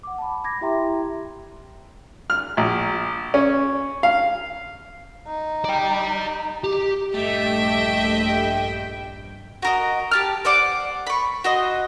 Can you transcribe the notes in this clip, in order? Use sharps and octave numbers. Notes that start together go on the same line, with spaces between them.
F#5 D6
A5 B5
B5 D6 G#6 A#6
E4 G4 E5 G5 A#5 C6
F6
A#1
C#4
F5
D#4
D5 G5
G4
A#1 G2 A3 G4 D#5 E5 G5
F#4 A#4 D#5
G4 A5 F6
C5 D5 F#5 D6
B5 C#6
F#4 C5 D#5